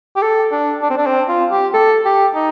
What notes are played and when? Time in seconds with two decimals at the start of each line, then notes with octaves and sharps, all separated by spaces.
0.16 G4
0.22 A4
0.52 D4
0.82 D4
0.90 C4
0.97 D4
1.06 C4
1.28 F4
1.51 G4
1.74 A4
2.05 G4
2.35 D#4